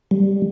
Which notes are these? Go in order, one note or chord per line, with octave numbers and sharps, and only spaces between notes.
G3